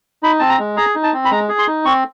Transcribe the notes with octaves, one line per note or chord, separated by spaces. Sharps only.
D#4 B5
C4 A5
A#5
G#3
G#4 A#5
D#4
A5
C4
B5
G#3 A#5
G#4
C6
D#4
C4 C#6